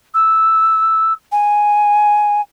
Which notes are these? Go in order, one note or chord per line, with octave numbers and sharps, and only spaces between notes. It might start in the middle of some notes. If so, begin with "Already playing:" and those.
E6
G#5